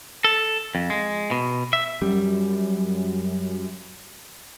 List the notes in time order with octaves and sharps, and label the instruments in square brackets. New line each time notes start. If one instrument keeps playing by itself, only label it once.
[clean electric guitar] A4
F2
G#3
B2
E5
[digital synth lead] F#2 [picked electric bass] G3